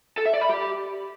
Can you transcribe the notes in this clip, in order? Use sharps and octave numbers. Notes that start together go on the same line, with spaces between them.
A4
E5
D5
B5
G4